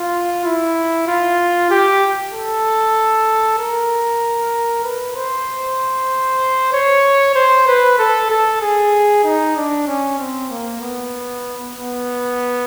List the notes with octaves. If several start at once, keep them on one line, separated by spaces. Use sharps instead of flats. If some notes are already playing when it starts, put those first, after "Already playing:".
Already playing: F4
E4
F4
G4
A4
A#4
B4
C5
C#5
C5
B4
A4
A4
G#4
D#4
D4
C#4
C4
A#3
B3
B3